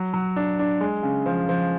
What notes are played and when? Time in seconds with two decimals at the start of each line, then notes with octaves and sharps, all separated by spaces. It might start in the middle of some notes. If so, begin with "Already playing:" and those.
Already playing: F#3
0.14 F#3
0.36 D4
0.59 D4
0.81 G#3
1.03 C#3
1.26 F3
1.49 F3